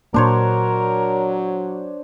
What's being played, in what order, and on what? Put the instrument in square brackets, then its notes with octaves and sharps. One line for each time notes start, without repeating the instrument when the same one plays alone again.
[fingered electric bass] A#2 A#3 [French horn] F#3 [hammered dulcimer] D4 C5 C#5 [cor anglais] A#4